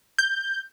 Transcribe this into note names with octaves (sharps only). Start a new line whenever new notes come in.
G6